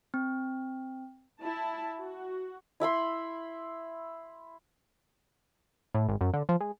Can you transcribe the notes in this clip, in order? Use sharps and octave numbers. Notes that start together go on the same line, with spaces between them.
C4
E4 A5
F#4
E4 E5 B5 C6
A2
G#1
F#2
D3
F3
G#3